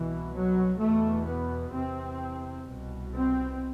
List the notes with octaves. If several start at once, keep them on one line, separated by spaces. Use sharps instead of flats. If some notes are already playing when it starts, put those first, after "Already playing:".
Already playing: C2 B2 E3
F#3
E2 B2 A3
B3
E2 C3 C4
C2 B2
C4